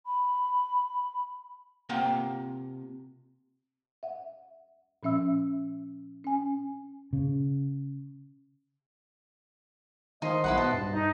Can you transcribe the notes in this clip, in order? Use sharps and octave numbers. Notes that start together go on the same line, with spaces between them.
B5
C3 A#3 C4 F4 F#5 G5
E5 F#5
A#2 F3 C#4 E5 E6
C#4 G#5
C#3
D#3 F3 D#4 D#5 C6
B1 E4 B4 F#5
B2 A5
G2
D#4